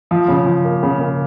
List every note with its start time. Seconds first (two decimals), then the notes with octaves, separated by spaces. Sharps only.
0.11 F3
0.28 C#3
0.46 F3
0.65 A#3
0.83 C#3
1.00 A#3